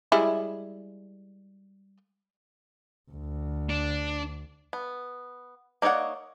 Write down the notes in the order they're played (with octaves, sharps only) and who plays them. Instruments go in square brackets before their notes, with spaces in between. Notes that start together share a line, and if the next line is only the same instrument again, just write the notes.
[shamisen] G3 G#3 E4
[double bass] D2
[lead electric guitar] D4
[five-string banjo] B3
A#3 D#4 C#5 D5 F#5